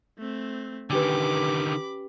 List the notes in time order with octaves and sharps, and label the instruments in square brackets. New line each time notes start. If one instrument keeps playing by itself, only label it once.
[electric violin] A3 C4
[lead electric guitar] D3 D#3 [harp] C#4 G4 B4 [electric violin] B5 D6